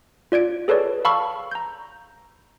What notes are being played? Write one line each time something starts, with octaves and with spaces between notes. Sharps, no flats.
F4 D5 G#6 D7
G#4 A4 B4 C#5 D5
F5 A5 B5 C#6 E6 F6
A#5 G6